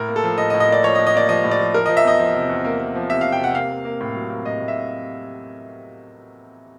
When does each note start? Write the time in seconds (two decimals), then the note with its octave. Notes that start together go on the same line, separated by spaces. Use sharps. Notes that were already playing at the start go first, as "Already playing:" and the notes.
Already playing: A2 A#4
0.09 A#3
0.16 A4
0.24 F3
0.38 A2 D#5
0.50 D#5
0.54 A2
0.60 D#5
0.69 A#3 D5
0.83 F3 C#5
0.95 D#5
0.99 A2
1.07 D#5
1.14 A#3 D5
1.29 F3 D#5
1.44 A2
1.51 D5
1.59 F3
1.74 F3 A#4
1.86 F3 D#5
1.97 E5
2.05 E2 D#5
2.19 F3
2.34 C3
2.49 E2
2.65 A#3
2.80 A#3
2.95 F3
3.09 C3 E5
3.21 C3 F5
3.32 G5
3.39 C3 F#5
3.54 A#3 F5
3.70 A#3
3.85 A#3
4.01 A2
4.15 F#3
4.30 A#3
4.45 A2 D#5
4.60 A2
4.68 E5